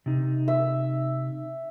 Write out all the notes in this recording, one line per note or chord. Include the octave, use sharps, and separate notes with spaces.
C3 D#4
E5